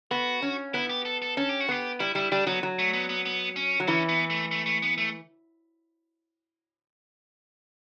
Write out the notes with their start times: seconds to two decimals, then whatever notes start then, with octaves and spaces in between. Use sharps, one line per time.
0.11 B3 F#4
0.42 C#4
0.74 B3 E4
0.89 G4
1.05 A4
1.22 A4
1.37 C#4 A4
1.49 G4
1.60 F#4
1.69 B3 G4
2.00 G3 E4
2.15 G3 E4
2.32 G3 D4
2.47 F#3 B3
2.63 F#3
2.79 A3
2.93 B3
3.09 B3
3.26 B3
3.56 C#4
3.80 F#3
3.87 E3 C#4
4.09 B3
4.30 A3
4.51 A3
4.66 A3
4.82 B3
4.98 A3